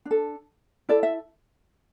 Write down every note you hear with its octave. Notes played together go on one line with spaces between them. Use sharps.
D4
A4
E4 A4 D5
E5